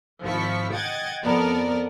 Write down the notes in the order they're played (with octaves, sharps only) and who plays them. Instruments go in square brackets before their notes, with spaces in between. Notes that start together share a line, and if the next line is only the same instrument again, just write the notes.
[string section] G#1 F3 E4 C#6 B6
D#5 F#5 G5 G#6 A6
F2 B3 A#4 D5 A5